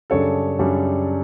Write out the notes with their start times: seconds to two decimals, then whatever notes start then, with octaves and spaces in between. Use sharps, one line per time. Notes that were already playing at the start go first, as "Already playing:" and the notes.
0.10 F#2 C#3 G3 D4 A4 C#5
0.59 F#2 C#3 G3 D4